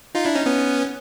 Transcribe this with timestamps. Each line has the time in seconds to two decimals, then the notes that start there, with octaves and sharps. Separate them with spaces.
0.15 D#4 F4
0.25 D4 E4
0.35 C#4 D#4
0.46 B3 C#4